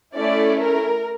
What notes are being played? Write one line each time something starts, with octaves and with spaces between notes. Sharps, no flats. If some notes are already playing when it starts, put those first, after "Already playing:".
A3 C#4 E4 D5
A#4